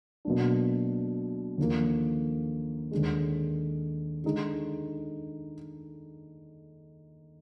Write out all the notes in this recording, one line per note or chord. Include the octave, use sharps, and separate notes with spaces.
B2 F#3 A#3 D4
D#2 D3 F3 A#3
D#2 D3 G#3
D3 G#3 D#4